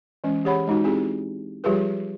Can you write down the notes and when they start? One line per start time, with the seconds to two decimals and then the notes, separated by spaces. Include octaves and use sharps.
0.24 E3 G#3 C#4
0.45 E3 G4 G#4 C#5 F#5 B5
0.67 G#3 D#4 F#4
0.84 C4 E4 G4 G#4
1.64 F3 G3 F4 G4 G#4 B4